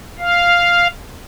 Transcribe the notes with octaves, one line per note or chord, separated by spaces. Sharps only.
F5